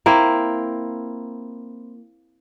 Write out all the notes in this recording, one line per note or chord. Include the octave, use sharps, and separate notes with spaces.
A#3 C4 E4